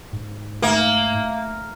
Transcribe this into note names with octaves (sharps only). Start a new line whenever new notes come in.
G#2
A3 A#3 E5